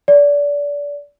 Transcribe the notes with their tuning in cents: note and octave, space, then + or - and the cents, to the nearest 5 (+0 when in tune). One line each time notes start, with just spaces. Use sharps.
D5 -25